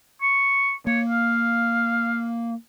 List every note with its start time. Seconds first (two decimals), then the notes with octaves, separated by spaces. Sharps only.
0.22 C#6
0.87 A#3 C#5
1.09 F5